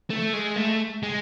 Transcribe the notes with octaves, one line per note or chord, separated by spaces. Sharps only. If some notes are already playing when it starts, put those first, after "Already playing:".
A3
G#3
A3
G#3